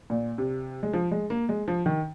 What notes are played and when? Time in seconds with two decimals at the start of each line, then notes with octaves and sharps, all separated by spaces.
0.10 A#2
0.38 C3
0.83 G#3
0.93 F3
1.11 G#3
1.30 A#3
1.49 G#3
1.68 F3
1.86 D#3